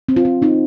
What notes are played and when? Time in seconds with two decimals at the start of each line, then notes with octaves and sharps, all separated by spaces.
0.09 C4
0.16 F4
0.25 C4
0.42 C4 D#4